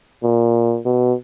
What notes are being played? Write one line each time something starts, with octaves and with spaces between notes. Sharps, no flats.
A#2
B2